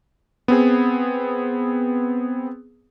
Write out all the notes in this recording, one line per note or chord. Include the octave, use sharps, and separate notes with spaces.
B3 C4 G#4